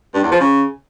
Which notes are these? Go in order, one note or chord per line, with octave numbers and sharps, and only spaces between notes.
G2
E2
F3
C#3